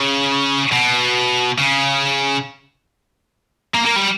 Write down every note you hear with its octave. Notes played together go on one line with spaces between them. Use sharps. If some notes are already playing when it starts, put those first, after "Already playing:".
Already playing: C#3
B2
C#3
A#3
A#3
G3